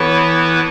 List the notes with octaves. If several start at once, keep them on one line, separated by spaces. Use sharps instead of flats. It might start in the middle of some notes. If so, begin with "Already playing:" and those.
Already playing: E3 B3 E4 A4 B4 C#5